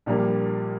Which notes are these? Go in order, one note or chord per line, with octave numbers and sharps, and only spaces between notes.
A#1 A#2 G3 A#3 D4